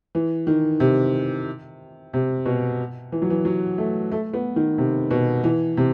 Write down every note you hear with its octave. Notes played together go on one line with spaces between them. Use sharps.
E3
D#3
C3
C3
B2
E3
F#3
E3
F#3
A3
A3
B3
D#3
C3
B2
E3
C3